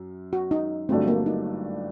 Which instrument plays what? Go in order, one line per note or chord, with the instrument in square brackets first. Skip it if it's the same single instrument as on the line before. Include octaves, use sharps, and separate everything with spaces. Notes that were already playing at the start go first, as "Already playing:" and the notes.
Already playing: [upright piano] F#2
[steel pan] F#4
D#4
[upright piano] G1 G2 F#3 A3 D4 [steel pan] C4
[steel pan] A#3
D#4